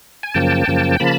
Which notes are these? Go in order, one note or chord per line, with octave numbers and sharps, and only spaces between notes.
G#5
F#2 C#3 F3 A#3 G5 A5
F#2 C#3 F3 A#3
C#3 F3 A#3 A5 B5